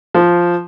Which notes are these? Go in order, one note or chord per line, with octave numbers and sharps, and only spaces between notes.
F3